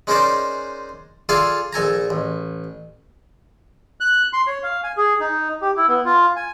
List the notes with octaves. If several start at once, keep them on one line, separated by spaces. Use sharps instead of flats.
G#3 C#4 D#4 A#4 C5 D5
F4 G#4 A4 D5 F5 G#5
A#1 A4 G#5 A#5
A1
F#6
C6
C#5
F5
G#5
G#4
D#4
G4
E4
B3
F4
G#5